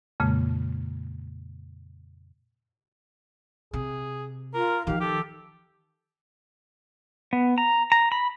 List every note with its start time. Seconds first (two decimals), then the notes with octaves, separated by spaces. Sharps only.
0.20 F2 A#2 C#3 G#3 A#3
3.73 C3 G#4
4.54 F4 A#4
4.87 D#3 F3 G4 F5
5.01 G4 A4
7.33 B3
7.58 A#5
7.92 A#5
8.12 B5